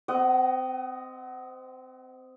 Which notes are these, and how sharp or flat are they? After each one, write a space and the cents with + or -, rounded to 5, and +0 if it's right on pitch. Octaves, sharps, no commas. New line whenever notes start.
C4 -20 D#5 +0 F#5 +35